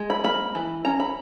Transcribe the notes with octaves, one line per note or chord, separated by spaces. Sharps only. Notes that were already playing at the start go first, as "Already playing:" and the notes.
Already playing: G#3
B5
A#3 B5
E3
C#4 A#5
B5